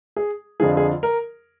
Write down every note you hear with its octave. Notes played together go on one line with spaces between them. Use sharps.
G#4
F2 D3 F3 G#4
G#4
A#4